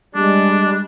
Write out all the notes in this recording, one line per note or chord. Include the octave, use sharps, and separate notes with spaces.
G3 G#3 D4